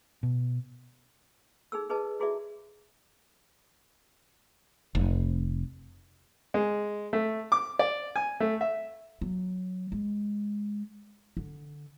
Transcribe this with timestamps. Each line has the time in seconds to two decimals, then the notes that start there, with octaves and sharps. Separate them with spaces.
0.23 B2
1.72 D#4 G#4 A4 E6
1.89 D#4 G#4 B4 D#5 A5
2.20 E4 F#4 G#4 A4 D5 E5
4.95 F1
6.54 G#3
7.13 A3
7.52 D6
7.79 D5
8.16 G#5
8.40 A3
8.61 E5
9.21 F#3
9.92 G#3
11.37 D3